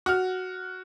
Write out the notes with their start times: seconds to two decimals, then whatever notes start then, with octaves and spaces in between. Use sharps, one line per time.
0.06 F#4 F6